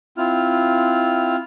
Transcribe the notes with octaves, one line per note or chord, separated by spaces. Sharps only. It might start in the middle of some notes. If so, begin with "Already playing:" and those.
C4 E4 F4 F6